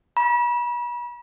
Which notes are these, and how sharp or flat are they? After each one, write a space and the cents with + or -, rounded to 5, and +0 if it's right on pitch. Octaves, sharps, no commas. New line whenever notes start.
B5 -40